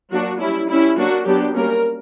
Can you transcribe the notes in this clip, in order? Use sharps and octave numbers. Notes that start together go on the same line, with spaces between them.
F#3 A#3 D4 F#4
G3 C#4 E4
G3 C#4 E4
F#3 A#3 D4 F#4
F#3 B3 D4 G4
G3 A#3 C#4 A#4